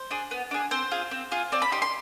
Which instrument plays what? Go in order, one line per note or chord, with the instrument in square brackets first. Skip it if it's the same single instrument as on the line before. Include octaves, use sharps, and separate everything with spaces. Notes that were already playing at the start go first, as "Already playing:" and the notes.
Already playing: [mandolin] C5
D4 G#4
B3
D4 G#4
C4 C5
F4 G#4
C4
F4 G#4
C4 D5
B5
D#4 G4 C6
C6